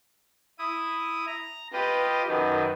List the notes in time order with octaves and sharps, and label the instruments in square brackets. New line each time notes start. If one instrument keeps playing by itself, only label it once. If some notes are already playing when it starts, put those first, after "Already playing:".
[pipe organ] E4 D#6
A#5
[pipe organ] F4 G4 D#5 [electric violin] B4
[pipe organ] F#2 D#3 [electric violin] B4